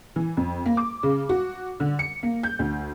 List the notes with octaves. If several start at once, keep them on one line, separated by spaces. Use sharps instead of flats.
E3
F2
A#3
D6
C#3
F#4
D3
C#7
A#3
G6
D2